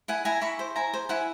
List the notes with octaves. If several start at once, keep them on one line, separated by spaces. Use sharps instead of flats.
E4 F#5 G#5
E4 G#5 A#5
E4 B5 C#6
C5
E4 G#5 A#5
C5
E4 F#5 G#5